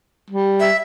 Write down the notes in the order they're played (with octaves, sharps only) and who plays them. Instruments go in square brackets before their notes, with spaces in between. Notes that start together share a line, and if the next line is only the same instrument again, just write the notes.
[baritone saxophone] G3
[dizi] E5